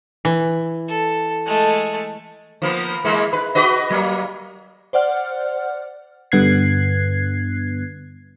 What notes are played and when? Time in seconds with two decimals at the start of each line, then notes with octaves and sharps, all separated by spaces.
0.25 E3
0.88 A4
1.46 G#3 A3
2.62 F3 A#3 B3
3.04 E3 G#3 A#3
3.33 B4
3.55 F#4 B4 D#5
3.90 F#3 A#3
4.93 C5 D5 F#5 F6
6.32 G2 D3 B3 F#6 G#6 C7